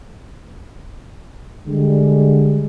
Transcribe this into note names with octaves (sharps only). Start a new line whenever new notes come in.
D3 G3 G#3